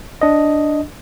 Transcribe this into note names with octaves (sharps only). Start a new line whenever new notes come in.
D4 D#5